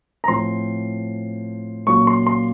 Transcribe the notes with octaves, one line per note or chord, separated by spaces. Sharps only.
A#5
A2 F3 C4 C6
A#2 F#3 A#3 C#4 C#6
C6
C6